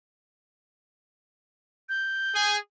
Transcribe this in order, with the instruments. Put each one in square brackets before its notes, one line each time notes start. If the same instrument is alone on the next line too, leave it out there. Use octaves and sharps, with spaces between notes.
[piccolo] G6
[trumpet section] G#4 G#5